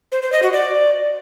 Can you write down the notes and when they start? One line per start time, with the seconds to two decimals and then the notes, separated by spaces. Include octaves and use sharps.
0.12 C5
0.22 C5
0.32 D#5
0.43 F#4
0.53 D5